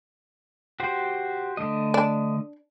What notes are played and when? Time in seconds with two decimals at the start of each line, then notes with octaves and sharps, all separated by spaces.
0.80 F#4 G4 C5
1.57 D3 A3 D#5
1.94 D4